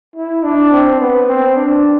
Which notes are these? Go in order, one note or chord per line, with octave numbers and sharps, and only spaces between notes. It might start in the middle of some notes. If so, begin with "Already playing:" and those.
E4
D4
C4
B3
C4
D4